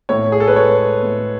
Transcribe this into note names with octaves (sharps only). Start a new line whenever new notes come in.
A2 C#5
G#4
A4
B4
G#3 C#5
A2